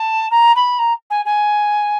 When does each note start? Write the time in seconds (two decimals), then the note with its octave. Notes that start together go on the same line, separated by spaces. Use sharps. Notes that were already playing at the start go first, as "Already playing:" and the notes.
Already playing: A5
0.31 A#5
0.56 B5
0.79 A#5
1.10 G#5
1.25 G#5